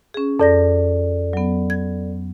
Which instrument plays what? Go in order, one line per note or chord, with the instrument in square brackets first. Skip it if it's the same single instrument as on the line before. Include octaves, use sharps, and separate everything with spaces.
[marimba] C#4 G#4
[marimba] F2 A#6 [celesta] A4 D5
[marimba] F#3 B3
G#6